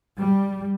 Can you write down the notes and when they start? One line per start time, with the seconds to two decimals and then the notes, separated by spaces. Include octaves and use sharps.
0.17 G3